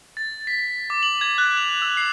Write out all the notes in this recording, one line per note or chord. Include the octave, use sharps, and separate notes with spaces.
A6
B6
D6
F#7
G#6
F#6
F7
E6
C7